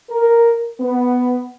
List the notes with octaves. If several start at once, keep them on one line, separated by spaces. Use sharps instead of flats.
A#4
B3